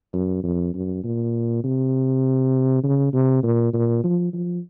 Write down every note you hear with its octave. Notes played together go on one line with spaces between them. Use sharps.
F#2
F2
F#2
A#2
C3
C#3
C3
A#2
A#2
F3
F3